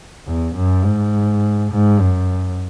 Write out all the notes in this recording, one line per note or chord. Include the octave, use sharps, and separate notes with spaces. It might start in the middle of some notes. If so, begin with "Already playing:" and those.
E2
F#2
G#2
G#2
F#2